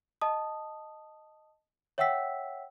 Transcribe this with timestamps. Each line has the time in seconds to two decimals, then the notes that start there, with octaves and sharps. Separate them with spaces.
0.21 D#5 A5 D#6
1.98 C#5 E5 F#5 G5 E6 B6